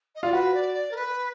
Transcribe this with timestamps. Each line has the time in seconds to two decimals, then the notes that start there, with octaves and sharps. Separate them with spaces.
0.16 D#5
0.23 F4 D5
0.33 F#4 B4
0.54 D5
0.74 D5
0.91 A#4
0.96 B4